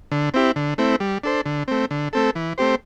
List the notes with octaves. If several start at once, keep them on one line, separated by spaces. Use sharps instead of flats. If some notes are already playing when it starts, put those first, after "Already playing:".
D3
C4 E4 G4
D3
A3 C4 E4
G3
D4 A4 C5
D3
A3 C4
D3
A3 C4 A4
E3
A3 C4 G4 C5